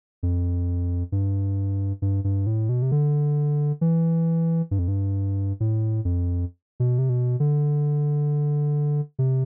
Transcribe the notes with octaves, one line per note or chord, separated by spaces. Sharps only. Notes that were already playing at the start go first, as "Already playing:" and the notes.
F2
G2
G2
G2
A2
B2
C3
D3
E3
G2
F2
G2
A2
F2
B2
C3
B2
D3
C3